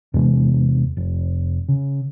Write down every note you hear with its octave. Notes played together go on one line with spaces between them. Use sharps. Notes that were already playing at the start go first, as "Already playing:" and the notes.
E2 C3 G#3
F1
C#3